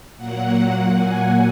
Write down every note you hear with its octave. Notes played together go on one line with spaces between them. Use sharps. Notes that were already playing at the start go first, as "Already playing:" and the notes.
A#2 F#3 A#3 F#5
G#5